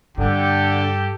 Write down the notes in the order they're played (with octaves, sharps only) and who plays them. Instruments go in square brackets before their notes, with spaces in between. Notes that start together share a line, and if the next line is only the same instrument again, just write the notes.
[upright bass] G2 [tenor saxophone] D3 [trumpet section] G4 A4